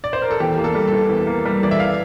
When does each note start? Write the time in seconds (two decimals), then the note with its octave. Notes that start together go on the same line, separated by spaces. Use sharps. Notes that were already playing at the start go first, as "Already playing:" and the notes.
0.04 D5
0.13 C5
0.22 A#4
0.31 A4
0.40 E2 G4
0.58 A#3
0.64 A4
0.75 G3
0.87 E3 A4
1.10 E2
1.27 A#3
1.45 G3
1.63 E3 D5
1.71 E5
1.80 F5